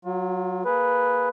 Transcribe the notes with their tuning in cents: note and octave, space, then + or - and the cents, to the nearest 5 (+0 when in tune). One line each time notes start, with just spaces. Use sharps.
F#3 +0 F4 +35
A#3 +0 G#4 +0 B4 +0